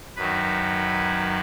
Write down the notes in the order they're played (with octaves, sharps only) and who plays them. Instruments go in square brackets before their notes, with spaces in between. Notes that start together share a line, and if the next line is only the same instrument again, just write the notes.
[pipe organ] F#2 D#3 F#3 B4